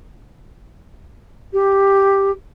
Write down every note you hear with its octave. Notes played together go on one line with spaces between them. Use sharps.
G4